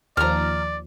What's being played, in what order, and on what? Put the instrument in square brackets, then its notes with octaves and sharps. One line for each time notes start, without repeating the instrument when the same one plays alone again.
[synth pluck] D#2 F3 [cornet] D5 [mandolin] A#5 F6